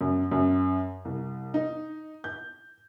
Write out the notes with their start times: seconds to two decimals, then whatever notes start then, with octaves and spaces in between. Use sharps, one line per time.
0.01 F#2
0.32 F#2
1.05 C2
1.54 D#4
2.24 G6